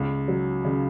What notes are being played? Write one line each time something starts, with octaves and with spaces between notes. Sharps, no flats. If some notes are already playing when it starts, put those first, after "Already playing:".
Already playing: C#2
F#3
C#3